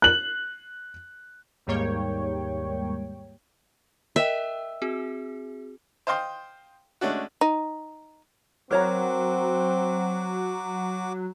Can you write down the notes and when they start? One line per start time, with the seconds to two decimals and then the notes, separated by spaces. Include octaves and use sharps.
0.02 F#6 F#7
1.66 D#2 G#2 G3 A#3 C#5 G5
4.16 A#4 D#5 E5 G5
4.82 C4 F#4 G#4
6.07 C5 D#5 F5 G5 C6
7.01 G#3 A3 C#4 D4 F#4
7.41 D#4
8.71 F#3 C4 F#4 A#4 C#5 A#5 D6